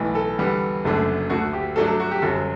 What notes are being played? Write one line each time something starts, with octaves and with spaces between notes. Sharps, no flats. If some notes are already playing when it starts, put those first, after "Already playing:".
Already playing: B1 A2 E3
A4
E2 D3 G3 B3
F#1 F#2 D3 A3 D4
D2 D3 A3 F#4
G4
G2 F#3 A3 D4 A4
A4
F#4
G4
G1 F#2 F#3 A4